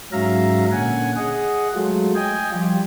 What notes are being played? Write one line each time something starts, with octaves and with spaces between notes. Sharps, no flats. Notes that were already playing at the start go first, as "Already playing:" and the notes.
G#2 F#3 C#4 E5 F5 A#5
A#2 D3 C#4 F#5 G#5
G#4 D#5 F#5
F#3 G#3 A3 F4
D#5 G5 G#5
F3 G3 F4 G4